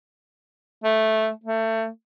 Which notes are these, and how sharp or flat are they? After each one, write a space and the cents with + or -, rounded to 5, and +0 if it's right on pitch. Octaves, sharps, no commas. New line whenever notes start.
A3 -5
A3 +25